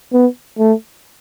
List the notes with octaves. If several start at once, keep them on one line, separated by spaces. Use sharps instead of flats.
B3
A3